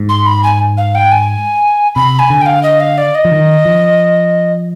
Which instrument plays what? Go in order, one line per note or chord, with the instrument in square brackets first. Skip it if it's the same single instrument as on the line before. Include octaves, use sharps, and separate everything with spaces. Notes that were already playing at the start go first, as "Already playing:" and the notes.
Already playing: [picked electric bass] G#2
[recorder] C6
B5
G#5
F5
G5
G#5
[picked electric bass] C3 [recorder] B5
[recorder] G#5
[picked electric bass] D3
[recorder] G5
F5
D#5
F5
D5
D#5
[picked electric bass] F3
D#3
F3